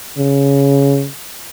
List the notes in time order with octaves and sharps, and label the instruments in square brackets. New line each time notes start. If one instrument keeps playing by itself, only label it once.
[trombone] C#3